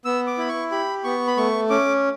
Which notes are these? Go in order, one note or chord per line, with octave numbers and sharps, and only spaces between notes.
B3 E6
D6
E4 B5
C#6
G4 B5
B3 C#6
B5
A3 C#6
C#4 D6